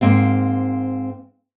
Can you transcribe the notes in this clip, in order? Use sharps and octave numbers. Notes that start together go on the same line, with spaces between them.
G#2 A#3 C4 F5